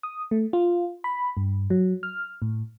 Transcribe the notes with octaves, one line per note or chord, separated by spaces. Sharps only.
D#6
A3
F4
B5
G2
F#3
F6
A2